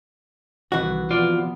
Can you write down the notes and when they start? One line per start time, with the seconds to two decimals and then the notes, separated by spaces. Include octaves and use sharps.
0.72 C2 D#3 E3 F#4
1.11 C3 F3 B3 F4 D5